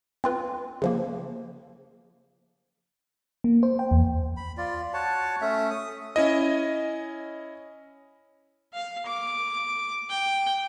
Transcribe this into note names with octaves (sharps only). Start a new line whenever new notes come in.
C4 F4 B4
C#3 F3 A#3
A#3
C5
G5
E2
B5
F4 D5
F#4 C#5 A5
A3 C#4 E5
D#6
C#4 E4 D#5
F5
D6
G5